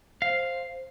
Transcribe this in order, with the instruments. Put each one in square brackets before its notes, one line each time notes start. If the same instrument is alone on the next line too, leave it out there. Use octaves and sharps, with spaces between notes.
[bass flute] C5 [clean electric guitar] F5